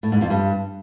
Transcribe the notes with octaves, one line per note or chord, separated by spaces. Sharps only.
A2
G#2
F2
G2